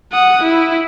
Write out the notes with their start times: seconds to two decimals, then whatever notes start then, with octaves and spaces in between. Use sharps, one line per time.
0.12 F#5 D#6
0.43 E4